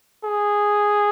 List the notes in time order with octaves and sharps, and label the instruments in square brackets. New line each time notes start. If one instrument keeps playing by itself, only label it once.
[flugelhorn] G#4